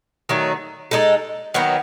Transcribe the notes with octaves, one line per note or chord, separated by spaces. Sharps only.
D#3 F#3 A3
G#3 D#4 A4
D#3 F#3 B3